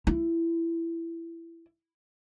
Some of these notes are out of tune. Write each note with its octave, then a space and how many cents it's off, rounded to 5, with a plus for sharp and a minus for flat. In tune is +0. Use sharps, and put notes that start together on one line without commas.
E4 +20